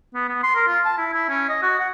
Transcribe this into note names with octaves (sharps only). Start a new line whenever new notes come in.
B3
B3
C6
A#4
F4
A5
E4
E4
C#4
D#5
F#4
F#5